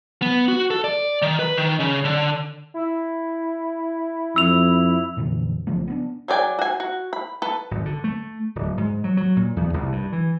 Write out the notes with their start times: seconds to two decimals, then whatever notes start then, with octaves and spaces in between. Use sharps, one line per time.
0.22 B3
0.48 F#4
0.71 A4
0.84 D5
1.22 D#3
1.39 B4
1.57 D#3
1.80 C#3
2.05 D3
2.74 E4
4.36 F2 E6 F7
5.17 F2 A#2 D3 E3
5.67 B1 C#3 F3 A3
5.88 B3 C4 D4
6.28 F#3 G#4 D5 G5 G#5
6.59 F#4 G#5
6.80 F#4
7.13 B5
7.42 A4 B4
7.71 G#1
7.85 D3
8.04 A3
8.55 D1
8.77 G#2
9.04 F#3
9.17 F#3
9.36 A#2
9.56 E2
9.74 C2
9.92 G2
10.12 E3